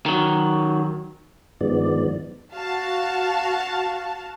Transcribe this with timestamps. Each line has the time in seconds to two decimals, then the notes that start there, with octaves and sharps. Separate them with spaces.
0.06 D#3 F#3
1.61 G2 D#3 F3 G#3 B3 D5
2.53 F#4 F5 A5